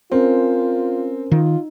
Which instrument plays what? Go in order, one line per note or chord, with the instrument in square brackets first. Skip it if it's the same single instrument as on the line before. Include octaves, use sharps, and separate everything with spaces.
[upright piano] C4 [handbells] C#4 A#4 C5 [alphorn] F4
[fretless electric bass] D#3 [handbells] D#4 [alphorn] F4